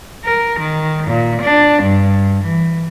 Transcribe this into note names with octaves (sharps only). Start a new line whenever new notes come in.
A#4
D#3
A#2
D4
G2
E3